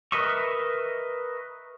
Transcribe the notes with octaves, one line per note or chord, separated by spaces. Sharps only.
A#4 B4 D#5 E5 C#6